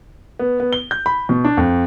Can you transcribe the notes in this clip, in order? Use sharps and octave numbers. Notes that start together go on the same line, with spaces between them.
B3
B3
G7
G6
B5
B2
D4
F2